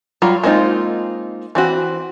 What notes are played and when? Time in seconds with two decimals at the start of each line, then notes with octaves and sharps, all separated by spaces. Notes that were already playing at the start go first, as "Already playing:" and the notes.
0.22 F#3 G3 F4 A#5
0.44 G#3 A#3 C4 D#4 F4
1.55 E3 C4 F#4